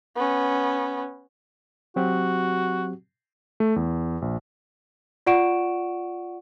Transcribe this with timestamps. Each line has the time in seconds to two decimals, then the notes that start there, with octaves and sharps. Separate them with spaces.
0.16 B3 C#4
1.96 F#3 C4 F#4 G4
3.60 A3
3.76 E2
4.22 A#1
5.26 F4 D5 F#5 C#6 D7 E7